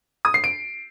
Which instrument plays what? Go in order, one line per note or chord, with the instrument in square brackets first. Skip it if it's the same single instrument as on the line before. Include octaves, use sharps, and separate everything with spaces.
[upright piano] D#6
C7
D7